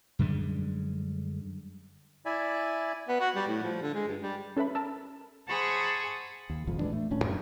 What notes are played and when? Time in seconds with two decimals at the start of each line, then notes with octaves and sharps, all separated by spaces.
0.19 F#2 D3 G3 G#3
2.26 E4 D5 E5 G#5
3.08 B3
3.20 F#4
3.35 G3
3.48 A2
3.63 F3
3.82 D3
3.94 G#3
4.07 G2
4.21 G3
4.57 C#4 A4 B4 E5 B5
4.75 A#4 A5 E6
5.48 G#4 C5 F#5 A5 B5 C#6
6.50 D#2
6.67 D#1 G#1 F2 F3
6.79 A2 E3 G#3 D4
6.93 A3
7.11 D#1 A2 C#4 D4
7.24 F#2